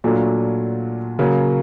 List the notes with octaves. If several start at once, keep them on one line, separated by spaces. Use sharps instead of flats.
A#2 F#3 A3 D4 F4
C#3 F#3 A#3